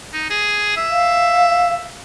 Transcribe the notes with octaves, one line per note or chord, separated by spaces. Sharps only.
D#4
G#4
E5
F5